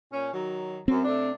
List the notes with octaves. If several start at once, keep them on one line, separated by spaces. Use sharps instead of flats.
A#2 C#4
D#3 F#3
F#2 C4
C3 A3 D4